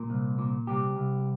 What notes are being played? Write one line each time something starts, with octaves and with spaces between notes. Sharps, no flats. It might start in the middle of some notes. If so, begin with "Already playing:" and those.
Already playing: A#2 A#4
C2
A#2
C2 G4
C2